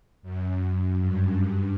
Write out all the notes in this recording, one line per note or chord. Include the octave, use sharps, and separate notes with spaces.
F#2
G2
G2